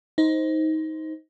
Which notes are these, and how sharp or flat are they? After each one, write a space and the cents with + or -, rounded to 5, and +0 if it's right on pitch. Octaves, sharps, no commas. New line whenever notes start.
D#4 +20 C5 +0